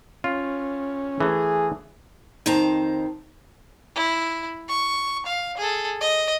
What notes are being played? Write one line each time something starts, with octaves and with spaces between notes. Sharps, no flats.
C#4 F4
E3 A3 G#4
F2 D#3 C4 C5 A5 A#5
E4
C#6
F5
G#4 A4
D#5